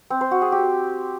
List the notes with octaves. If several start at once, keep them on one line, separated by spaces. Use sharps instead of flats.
C4
C5
F#4
G#4
G4